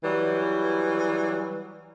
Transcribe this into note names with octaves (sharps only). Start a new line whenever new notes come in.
E3 F#3 G3